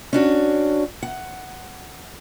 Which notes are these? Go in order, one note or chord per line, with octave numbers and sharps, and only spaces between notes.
C#4 D4 F#4
F#5